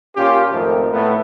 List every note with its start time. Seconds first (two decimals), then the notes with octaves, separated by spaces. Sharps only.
0.16 A#2 C#4 F4 G4
0.51 G#1 F2 D#3 F3 A3
0.92 A2 A3 B3